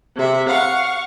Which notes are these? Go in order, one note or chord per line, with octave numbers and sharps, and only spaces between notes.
C3 E5
F5 F#5 C#6